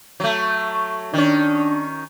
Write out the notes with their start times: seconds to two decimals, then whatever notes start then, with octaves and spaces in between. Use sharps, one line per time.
0.20 F#3 A3
1.14 D#3 C#4 D4